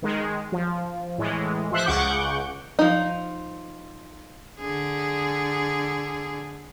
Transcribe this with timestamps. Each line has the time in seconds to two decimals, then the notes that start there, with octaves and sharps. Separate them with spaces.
0.02 D#3 G#3
0.52 F3
1.18 A2 E3 G#3
1.72 F3 C5 E5 F#6
1.85 C#2 C#3 F#5 C#6 D6 G6
2.79 F3 D#4
4.60 D3 G#4